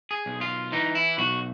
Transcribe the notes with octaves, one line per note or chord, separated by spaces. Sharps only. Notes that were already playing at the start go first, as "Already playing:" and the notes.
G#4
B1
F4
E3 D#4
E4
B1 F#4